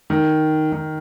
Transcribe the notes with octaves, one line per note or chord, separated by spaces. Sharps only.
D#3
D#3